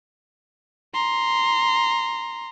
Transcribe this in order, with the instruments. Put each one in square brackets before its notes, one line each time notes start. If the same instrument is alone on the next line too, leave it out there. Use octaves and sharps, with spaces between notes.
[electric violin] A#5 C6